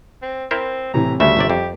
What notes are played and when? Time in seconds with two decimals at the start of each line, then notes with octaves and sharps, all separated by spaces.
0.22 C4
0.51 C4 E4 A#4 C5
0.94 A2 C3 E3 A#5
1.20 D2 C#3 G3 E5 C#6
1.37 G1 C3 D5
1.50 F2 G4